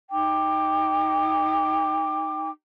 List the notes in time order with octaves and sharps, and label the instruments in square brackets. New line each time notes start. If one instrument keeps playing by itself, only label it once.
[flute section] D#4 G5 D6